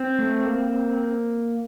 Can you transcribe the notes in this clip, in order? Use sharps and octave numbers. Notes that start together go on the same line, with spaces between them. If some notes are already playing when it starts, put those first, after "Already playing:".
Already playing: C4
A3
A#3